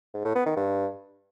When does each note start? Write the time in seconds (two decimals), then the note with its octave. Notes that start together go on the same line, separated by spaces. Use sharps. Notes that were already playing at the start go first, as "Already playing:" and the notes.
0.14 G#2
0.24 A2
0.35 B3
0.46 D#3
0.56 G2